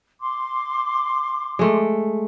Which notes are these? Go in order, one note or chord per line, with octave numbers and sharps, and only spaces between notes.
C6 D6
G#3 A3